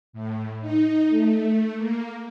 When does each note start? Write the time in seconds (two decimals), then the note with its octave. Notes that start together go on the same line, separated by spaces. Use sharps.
0.13 A2
0.61 D#4
1.09 A3
1.77 A#3